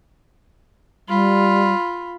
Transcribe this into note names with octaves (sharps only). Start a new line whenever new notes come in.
G3 F4 B5